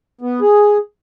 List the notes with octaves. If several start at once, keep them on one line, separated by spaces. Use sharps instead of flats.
B3
G#4